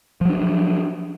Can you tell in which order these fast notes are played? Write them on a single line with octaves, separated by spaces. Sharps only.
F3 F#3 D4